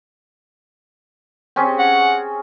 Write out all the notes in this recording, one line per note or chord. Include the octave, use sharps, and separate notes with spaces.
C4 C#4 G#4
F#5